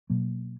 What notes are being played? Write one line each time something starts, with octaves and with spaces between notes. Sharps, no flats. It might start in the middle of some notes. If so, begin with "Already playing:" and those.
B2 F#3 A#3